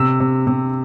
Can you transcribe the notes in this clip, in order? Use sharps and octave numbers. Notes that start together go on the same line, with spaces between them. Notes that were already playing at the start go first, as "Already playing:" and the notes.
Already playing: C3 E6
C3
C3